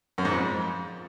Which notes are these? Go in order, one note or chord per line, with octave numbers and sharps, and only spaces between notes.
F#2
G#2
F2